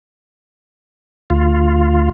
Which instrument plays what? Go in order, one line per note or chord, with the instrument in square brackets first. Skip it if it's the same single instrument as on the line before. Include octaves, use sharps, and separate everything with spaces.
[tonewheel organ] D2 F4